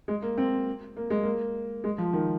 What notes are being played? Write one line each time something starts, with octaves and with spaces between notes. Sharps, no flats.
G#3
A#3
C4
A#3
G#3
A#3
G#3
F3
D#3